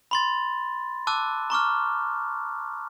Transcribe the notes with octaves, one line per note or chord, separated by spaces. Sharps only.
B5 C6 A6
A5 D6 E6 F#6
A#5 C#6 D6 F6